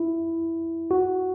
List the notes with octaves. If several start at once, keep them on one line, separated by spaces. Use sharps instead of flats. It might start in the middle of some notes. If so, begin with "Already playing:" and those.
Already playing: E4
F#4